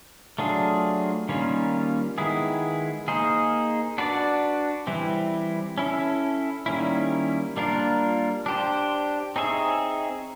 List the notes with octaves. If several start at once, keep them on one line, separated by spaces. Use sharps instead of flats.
F#3 A3 D4 F4 G#4
D#3 G3 A#3 C#4 F4
D#3 G#3 B3 E4 G#4
A#3 D#4 G#4 C5
D4 F#4 B4 D5
E3 G3 C4 E4
C#4 E4 A4
D#3 G3 A#3 C#4 E4
G3 A#3 D4 F4 A#4
D4 G4 C5
C4 D#4 G#4 C#5 E5